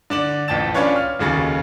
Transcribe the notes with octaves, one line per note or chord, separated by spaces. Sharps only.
D3 D5 E7 F#7
A1 F2 G5 A5 A6 E7
C#4 D4 F4 B4 C#5
F6
F1 D#2 C#3 F#4 A6